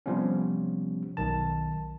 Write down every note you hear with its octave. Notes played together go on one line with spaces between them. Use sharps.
C3 F3 G3 B3 C#4
B1 D#3 A5